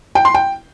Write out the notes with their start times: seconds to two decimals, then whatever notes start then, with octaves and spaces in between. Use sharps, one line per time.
0.15 G5
0.25 C6
0.34 G5